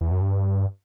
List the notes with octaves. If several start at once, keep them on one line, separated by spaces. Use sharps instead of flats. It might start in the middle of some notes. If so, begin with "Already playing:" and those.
E2
F#2
G2